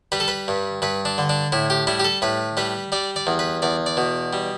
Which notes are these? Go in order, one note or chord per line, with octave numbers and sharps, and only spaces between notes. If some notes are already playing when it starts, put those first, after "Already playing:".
G3 B4
A4
B4
G2
G2 B4
D4
D3
D4
A2 E4
G4
G3 E4
G4
A4
A2 B4
G3 B4
G3 D5
D5
E2
B4
E2 D5
D5
B2
G3